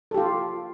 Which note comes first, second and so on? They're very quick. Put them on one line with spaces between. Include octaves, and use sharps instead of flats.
A4 G4 F4